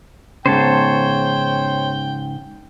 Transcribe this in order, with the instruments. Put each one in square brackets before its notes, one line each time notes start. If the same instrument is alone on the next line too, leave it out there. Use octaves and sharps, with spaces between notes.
[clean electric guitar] G#2 C#3 [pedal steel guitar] C5 C#5 A5 [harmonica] G5